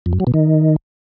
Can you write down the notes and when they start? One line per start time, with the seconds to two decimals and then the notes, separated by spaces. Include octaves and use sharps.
0.06 F2
0.13 F#2
0.20 F#3
0.27 B2
0.34 D#3